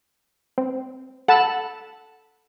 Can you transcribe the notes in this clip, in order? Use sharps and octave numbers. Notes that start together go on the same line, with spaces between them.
C4
A4 F#5 A5 B5